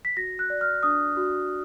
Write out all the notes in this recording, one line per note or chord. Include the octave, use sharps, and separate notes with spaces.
B6
F#4 A#6
F#6
D5
F6
D4 D#6
F#4